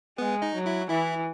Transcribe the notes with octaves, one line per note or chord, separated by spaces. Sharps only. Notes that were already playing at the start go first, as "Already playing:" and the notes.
G#3 B3 B4
D#4 D#5
F#3
E4 E5
E3 E4 E5